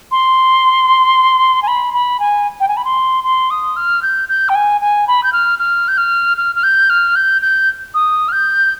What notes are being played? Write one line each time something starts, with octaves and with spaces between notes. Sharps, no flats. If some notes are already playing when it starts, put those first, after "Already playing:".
C6
G#5
B5
B5
G#5
G5
G#5
B5
C6
C6
D#6
F6
G6
G6
G5
G#5
G#5
B5
G6
F6
F6
G6
F6
F6
F6
G6
F6
G6
G6
D#6
F6
G6